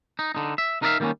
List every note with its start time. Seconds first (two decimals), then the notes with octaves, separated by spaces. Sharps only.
0.19 D#4
0.35 D3 D#4
0.58 E5
0.82 D#4 A#4 B4 D5 E5 F5
1.00 D#3 G3 A#3 C4 C#4